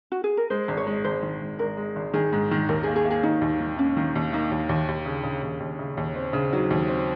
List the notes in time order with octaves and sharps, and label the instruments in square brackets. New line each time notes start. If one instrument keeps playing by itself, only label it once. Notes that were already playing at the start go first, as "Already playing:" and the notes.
[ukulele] F#4
G#4
A#4
[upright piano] G#3 [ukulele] C5
[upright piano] G#1
[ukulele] C#5
[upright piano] G#3
[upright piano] G#1 [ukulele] C5
[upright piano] D#3
G#1
[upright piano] G#1 [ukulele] A#4
[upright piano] G#3
G#1
[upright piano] D#3 [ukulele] G#4
[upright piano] G#2
D#3
[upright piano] D#2 [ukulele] A#4
[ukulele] G#4
[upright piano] A#3
[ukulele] G#4
[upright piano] A#3
[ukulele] G#4
[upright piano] D#2 [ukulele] D#4
[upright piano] D#2
D#3
[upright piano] A#3 [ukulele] C#4
[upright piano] D#3
D#2
[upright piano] A#3 [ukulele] D#4
[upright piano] D#2
D#2
D#2
C#3
C#3
D#2
D#2
C#3
D#2
C4
C#3
[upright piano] F#3 [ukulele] D#4
[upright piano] D#2
C4